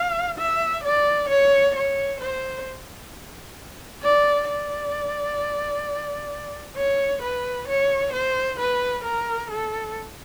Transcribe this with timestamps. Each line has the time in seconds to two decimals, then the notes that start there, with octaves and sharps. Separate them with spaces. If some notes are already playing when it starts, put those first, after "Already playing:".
Already playing: F5
0.38 E5
0.84 D5
1.30 C#5
1.75 C#5
2.21 C5
4.03 D5
4.49 D5
6.77 C#5
7.22 B4
7.68 C#5
8.13 C5
8.59 B4
9.05 A#4
9.50 A4